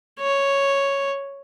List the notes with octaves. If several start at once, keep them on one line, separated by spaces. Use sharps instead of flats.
C#5